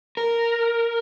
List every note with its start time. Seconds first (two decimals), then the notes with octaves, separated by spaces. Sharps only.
0.17 A#4